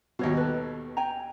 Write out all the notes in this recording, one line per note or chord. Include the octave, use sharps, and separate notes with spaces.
D#2 B2 F#4 C#5 D#5
A4 B4
G5 G#5 A#5